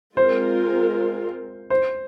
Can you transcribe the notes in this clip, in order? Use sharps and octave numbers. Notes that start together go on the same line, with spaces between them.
G#3 C4 F4 A#4 C5
C5